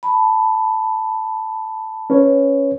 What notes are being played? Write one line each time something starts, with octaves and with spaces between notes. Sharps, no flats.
A5 B5
C#4 B4 C#5